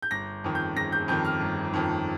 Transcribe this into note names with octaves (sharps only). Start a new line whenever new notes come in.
G6
G1 A#6
F2 D#3
G6
G1 A#6
G6
F2 D#3 G6
F6
G1
F2 D#3